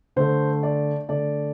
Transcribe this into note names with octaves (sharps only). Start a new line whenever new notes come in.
D3 A3 C5
D5
D3 A3 D5